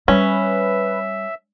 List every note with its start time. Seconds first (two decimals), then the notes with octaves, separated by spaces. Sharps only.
0.08 G3 C#4 B4 E5